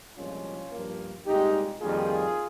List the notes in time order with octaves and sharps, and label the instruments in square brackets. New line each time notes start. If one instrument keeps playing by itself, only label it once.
[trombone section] C2 A#2 F3 G#3 C#4 F4
G2 F3 A#3
C2 A#2 G#3 D#4 G4
F2 D#3 G3 A#3 F4 G#4